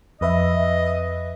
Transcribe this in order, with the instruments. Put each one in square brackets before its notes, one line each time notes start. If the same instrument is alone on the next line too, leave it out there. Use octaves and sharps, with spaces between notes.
[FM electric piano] F2 B4 E5 [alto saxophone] D#5